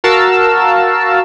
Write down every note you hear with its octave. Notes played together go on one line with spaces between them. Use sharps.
F#4 A#4 F5 A5 E6